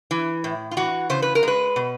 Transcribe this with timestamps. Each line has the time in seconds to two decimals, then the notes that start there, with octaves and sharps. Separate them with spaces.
0.11 E3
0.44 A2
0.71 F4
0.77 E3 F#4
1.10 C#3 C5
1.22 B4
1.35 A#4
1.43 G#3 B4
1.76 B2